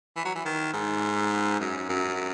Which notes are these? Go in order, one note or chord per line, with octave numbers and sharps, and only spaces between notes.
E3
F#3
E3
D#3
G#2
F#2
F#2